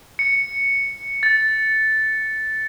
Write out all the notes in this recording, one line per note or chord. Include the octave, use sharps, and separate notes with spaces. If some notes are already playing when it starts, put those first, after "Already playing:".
C#7
A6